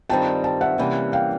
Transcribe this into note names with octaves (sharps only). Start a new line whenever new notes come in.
G2 D#3 G3 C4 F4 G5 A5
G5 A5
E5 F#5
C3 E3 G3 A#3 C#4
F5 G5